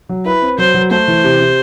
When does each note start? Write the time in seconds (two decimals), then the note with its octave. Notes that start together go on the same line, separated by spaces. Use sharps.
0.09 F#3
0.25 E4 B4
0.42 C4
0.58 F#3 C5
0.74 F#3
0.91 A3 C5
1.08 E3
1.24 C3
1.40 C3